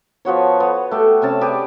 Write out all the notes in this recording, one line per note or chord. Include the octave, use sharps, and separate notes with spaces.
F3 B3 F#4 C#5
B3
A3 G4
C3 C#4 A5
G4 G#4 B4 D5